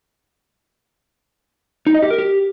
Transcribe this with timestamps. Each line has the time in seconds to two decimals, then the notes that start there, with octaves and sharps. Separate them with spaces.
1.87 D#4
1.94 D#5
2.02 G4
2.10 A#4
2.18 G4